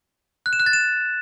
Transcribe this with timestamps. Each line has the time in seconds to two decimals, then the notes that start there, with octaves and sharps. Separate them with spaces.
0.46 F#6
0.53 E7
0.60 F#6
0.66 A6
0.73 E7